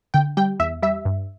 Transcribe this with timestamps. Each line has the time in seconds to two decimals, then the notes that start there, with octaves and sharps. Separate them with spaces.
0.14 D3 G5
0.37 G3 G5
0.59 E2 E5
0.82 G3 E5
1.05 G2